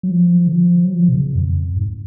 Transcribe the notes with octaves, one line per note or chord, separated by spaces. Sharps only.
F#3
F3
D3
F3
F#3
F3
B2
C#3
F2
G#2